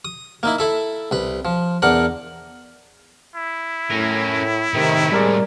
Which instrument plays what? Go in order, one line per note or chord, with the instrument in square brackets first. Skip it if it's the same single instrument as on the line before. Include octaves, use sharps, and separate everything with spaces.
[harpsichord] D#6
A#3 D#4 E4
E4 A4 E5
C2 B4
F3
E2 D4 A#4 F#5
[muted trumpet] E4
[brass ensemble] A2 [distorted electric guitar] C#4 A#4
[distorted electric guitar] A2 C4 [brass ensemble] C3 D#3
[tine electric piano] G3 A#4 D5 [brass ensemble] G#3